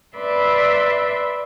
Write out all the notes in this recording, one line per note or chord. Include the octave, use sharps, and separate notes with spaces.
B4 D5 E5 B5 C6